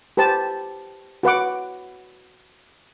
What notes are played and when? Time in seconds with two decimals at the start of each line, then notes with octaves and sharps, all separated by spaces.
0.17 G4 B4 C5 A5
1.23 F#4 B4 F#5 D6